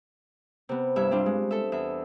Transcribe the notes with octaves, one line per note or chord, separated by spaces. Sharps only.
C3 B3
G2 E4 E5
G3 C4 D4 F4
G#3
A4 E5
E2 E5